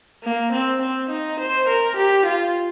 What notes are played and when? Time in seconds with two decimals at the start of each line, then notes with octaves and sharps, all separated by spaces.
0.23 A#3
0.52 C4
0.81 C4
1.10 D#4
1.39 C5
1.68 A#4
1.96 G4
2.25 F4